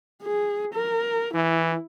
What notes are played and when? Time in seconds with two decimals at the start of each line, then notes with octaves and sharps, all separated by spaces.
0.23 G#4
0.74 A#4
1.34 E3 E4